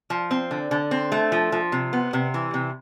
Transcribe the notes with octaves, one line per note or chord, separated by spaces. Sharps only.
F3
C4
D3
D3
C4
A3
F3
F3
C3
B3
C3
E3
C3